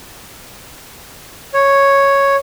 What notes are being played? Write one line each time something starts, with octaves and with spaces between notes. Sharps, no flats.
C#5